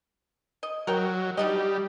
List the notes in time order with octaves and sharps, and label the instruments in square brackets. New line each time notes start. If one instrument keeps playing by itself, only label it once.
[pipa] D#5
[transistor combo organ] F#3 [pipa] A#4 C#5 G5
[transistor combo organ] G3 [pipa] D4 D#4 D#5